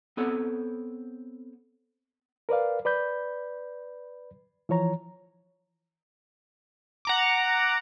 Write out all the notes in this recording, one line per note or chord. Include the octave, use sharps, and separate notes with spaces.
B3 C4 A4 C#5 F#5
A#4 B4 D5 F5
B4 D5 B5 G6
E3 F3 C#5 A#5
F#5 A#5 D6